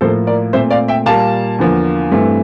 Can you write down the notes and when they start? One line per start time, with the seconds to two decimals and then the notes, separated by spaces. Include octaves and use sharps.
0.01 A2 F3 A#3 A4 C5
0.27 A#4 D5
0.53 A#2 A3 C4 C5 E5
0.70 D5 F5
0.88 E5 G5
1.06 A#2 G3 A#3 F5 A5
1.59 E2 D3 F3 A#3
2.12 G2 E3 A3 C4